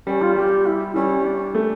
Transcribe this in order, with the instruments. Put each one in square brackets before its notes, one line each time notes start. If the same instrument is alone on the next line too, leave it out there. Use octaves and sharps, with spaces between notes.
[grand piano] G3 [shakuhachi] C#4
[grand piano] G3 [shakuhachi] F4
[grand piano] G3 [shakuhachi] G4
[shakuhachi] E4
[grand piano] G3 [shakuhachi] C#4
[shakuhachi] D4
[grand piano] A3